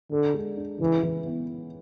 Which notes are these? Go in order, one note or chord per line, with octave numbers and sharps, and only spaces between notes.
D3 A4
G#3
D4
C#3 E3
E3
B3